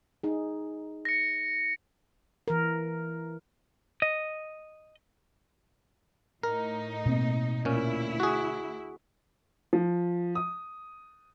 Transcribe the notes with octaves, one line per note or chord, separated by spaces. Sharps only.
D#4 G#4
A#6 C#7
E3 A#4
D#5
A2 D#4 A#4
B2 A#3 C4
D2 A#2 C#4 E4
F#4 G#4
F3
D#6